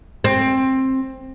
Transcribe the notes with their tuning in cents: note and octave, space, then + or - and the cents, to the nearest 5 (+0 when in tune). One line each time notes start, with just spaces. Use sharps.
C4 +15